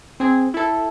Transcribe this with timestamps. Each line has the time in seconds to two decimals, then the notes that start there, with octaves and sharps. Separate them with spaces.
0.20 C4 G#4
0.54 E4 A4